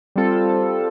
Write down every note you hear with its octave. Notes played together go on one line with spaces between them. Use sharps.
G3 C4 F4 A4